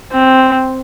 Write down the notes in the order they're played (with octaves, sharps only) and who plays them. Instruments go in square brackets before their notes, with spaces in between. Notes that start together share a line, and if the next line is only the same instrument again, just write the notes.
[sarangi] C4